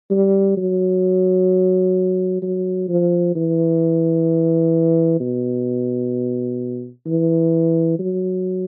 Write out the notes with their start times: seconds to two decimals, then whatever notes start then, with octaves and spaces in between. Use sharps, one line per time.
0.11 G3
0.57 F#3
2.42 F#3
2.89 F3
3.35 E3
5.20 B2
7.06 E3
7.99 F#3